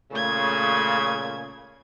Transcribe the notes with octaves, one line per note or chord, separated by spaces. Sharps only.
A#2 C#3 A3 G#6